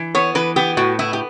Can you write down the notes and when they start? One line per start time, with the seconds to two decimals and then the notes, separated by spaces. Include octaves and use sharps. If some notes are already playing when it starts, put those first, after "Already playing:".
Already playing: E3
0.15 B3 C#5
0.35 E3 B4
0.56 B3 G4
0.77 A2 F#4
0.99 B3 E4
1.13 G4